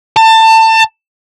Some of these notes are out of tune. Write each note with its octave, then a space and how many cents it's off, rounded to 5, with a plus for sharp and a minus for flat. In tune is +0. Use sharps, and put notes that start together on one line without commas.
A5 +25